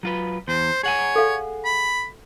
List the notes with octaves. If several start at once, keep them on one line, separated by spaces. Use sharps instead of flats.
F#3 F4 B4
E2 C5
G#4 C#5 F#5 G#5
A4 F5
B5